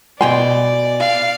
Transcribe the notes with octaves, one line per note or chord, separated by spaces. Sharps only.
B2 D5 G5 G#5 C6
F5